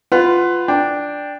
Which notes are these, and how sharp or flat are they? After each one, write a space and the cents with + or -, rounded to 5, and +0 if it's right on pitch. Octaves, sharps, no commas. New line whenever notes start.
F4 +0 B4 +20 F#5 +0
D4 +0 G5 +10